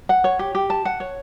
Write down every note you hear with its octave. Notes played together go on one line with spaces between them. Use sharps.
F#5
C#5
G4
G4
A5
F#5
C#5